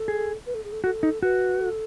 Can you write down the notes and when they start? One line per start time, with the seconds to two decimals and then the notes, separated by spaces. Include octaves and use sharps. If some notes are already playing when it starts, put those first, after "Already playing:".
Already playing: A4
0.08 G#4
0.46 B4
0.54 A4
0.64 G#4
0.72 A4
0.84 F#4 A4
1.03 D#4
1.23 F#4 B4
1.60 A4